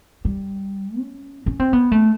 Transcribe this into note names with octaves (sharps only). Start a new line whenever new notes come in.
G3
C#4
C#4
C4
B3
A3